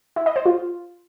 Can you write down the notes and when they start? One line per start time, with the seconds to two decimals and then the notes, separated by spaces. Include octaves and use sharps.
0.16 E4
0.26 D#5
0.36 C5
0.46 F4